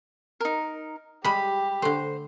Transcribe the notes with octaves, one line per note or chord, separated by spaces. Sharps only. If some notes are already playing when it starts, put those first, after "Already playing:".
D#4 A#4
G3 G#3 G4 B5
D3 A3 C5